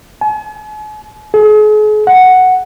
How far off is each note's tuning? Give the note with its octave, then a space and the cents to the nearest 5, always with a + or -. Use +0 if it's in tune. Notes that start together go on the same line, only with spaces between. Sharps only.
G#5 +45
G#4 +40
F#5 +0